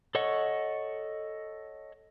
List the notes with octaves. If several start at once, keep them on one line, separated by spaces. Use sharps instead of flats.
A4 C#5 D#5 F#5 C#6